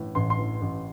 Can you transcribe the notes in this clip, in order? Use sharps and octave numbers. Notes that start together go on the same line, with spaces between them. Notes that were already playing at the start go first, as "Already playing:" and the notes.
Already playing: A1 A2 E3
A1 C6
C6
E3
A1